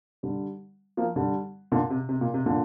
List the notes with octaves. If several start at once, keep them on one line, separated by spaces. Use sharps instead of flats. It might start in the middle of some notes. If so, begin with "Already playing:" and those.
D3 G3
F3 A#3
D3 G3
A#2 D3
C3
C3
A#2
C3
A#2 D3